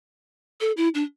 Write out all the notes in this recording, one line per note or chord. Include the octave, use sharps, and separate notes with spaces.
A4
E4
D4